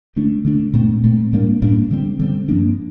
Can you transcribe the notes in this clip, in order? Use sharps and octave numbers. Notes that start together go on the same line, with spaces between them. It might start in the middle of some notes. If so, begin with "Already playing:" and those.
D3 A3 D4
D3 A3 D4
A#2 A3 C4
A#2 A3 C4
A2 G3 A#3 D4
A2 G3 A#3 D4
D3 G3 C4
D3 G3 C4
G2 F3 A#3 D4